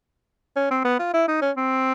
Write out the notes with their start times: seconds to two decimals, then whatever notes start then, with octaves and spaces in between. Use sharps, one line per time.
0.56 C#4
0.71 C4
0.85 B3
0.99 F4
1.14 E4
1.28 D#4
1.42 C#4
1.57 C4